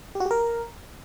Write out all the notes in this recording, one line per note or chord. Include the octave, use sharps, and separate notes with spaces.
G4
F#4
G4
A#4